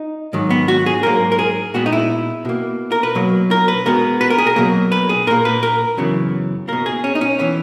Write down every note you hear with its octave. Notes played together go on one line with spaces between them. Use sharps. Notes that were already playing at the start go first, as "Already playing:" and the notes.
Already playing: D#4
G#2 D#3 F#3
B3
F#4
G#4
G#2 F#3 A#3 A#4
A#4
G#4
A#2 G#3 B3 F#4
D#4
E4
B2 A#3
A#4
B4
B2 F#3 A#3
A#4
B4
B2 G#3 B3 A#4
B4
A#4
G#4
A#4
B2 F#3 A#3
B4
G#4
A#2 A#3 A#4
B4
A#4
F#2 C#3 E3 B3
B2 A#3 A#4
G#4
C#4
D#4
C#4
E3 B3 C#4